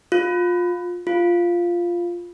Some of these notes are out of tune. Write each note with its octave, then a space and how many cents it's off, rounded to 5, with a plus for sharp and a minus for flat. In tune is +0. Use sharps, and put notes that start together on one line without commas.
F4 +20
F4 -5